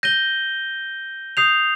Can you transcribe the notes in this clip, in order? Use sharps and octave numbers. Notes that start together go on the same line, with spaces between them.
G6 A#6 D#7 G7
D#6 G6 C7 F7